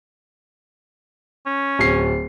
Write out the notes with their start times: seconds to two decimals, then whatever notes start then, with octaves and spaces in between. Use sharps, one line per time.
1.46 C#4
1.79 D1 C7